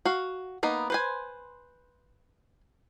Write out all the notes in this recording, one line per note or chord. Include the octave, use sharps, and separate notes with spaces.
F#4 F5
A#3 B3 D#4
B4 C5 G#5